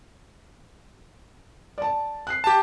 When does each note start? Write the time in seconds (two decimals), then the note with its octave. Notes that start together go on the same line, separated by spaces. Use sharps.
1.78 D5 A5
2.27 F#6 C7
2.44 G4 A5